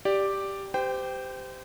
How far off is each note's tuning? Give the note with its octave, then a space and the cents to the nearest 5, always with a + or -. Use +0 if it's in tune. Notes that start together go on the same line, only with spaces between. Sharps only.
G4 +0 D5 +0
G4 +0 C5 -30 G5 +0